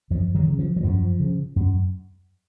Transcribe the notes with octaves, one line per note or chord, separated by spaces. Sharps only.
F#2 F3
D#3 F#3
C#3
F3
F#3
F#2 F3
C#3
F#2